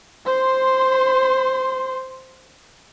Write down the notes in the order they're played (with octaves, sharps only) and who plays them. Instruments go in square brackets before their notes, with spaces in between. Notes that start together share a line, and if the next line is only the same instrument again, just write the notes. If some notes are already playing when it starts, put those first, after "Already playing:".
[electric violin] C5 C6